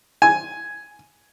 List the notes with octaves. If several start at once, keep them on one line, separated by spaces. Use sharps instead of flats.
G#5